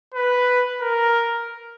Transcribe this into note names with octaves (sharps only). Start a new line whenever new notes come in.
B4
A#4